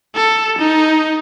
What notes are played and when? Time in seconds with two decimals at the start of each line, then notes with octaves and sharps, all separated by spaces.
0.16 A4
0.59 D#4